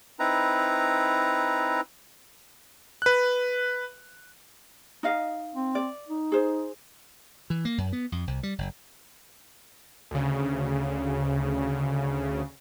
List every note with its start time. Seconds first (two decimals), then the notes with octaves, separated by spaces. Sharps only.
0.19 C4 D#4 E4 B4 A#5
3.02 B4 F#6
5.03 D#4 D#5 F5
5.55 C4
5.75 D5
6.08 D#4
6.32 G#4 C5
7.50 E3
7.65 A#3
7.78 F#2
7.93 B3
8.12 F2
8.27 C2
8.43 G3
8.58 F#1
10.11 D2 C#3